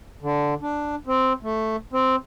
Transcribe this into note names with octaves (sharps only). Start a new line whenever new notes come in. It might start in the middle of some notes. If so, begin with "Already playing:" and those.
D3
D4
C4
A3
C4